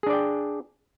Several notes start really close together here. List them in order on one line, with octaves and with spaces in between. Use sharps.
G#4 D4 D5 G5